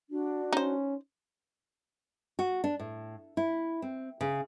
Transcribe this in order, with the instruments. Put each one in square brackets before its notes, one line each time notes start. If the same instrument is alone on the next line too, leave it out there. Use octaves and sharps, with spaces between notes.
[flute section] D4 F#4
[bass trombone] C#4 [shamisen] D#4 C5
[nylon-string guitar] F#4
D4
A2
E4
C4
C#3